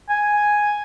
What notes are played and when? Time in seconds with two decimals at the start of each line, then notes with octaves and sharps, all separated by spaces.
0.10 G#5